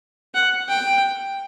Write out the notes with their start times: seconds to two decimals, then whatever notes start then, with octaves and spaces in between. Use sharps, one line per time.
0.34 F#5
0.68 G5